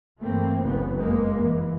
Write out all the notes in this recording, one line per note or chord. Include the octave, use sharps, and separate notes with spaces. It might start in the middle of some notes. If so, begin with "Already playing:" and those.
G2 E3 A3 A#3 C4
F#1 C2 F#2 C#3 B3
F2 G#3 A#3
E3